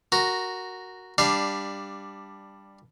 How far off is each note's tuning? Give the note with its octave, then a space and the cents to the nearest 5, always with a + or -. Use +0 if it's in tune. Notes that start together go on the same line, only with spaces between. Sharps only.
F#4 +0 A#4 +0
G3 +10 D4 +0 F5 +0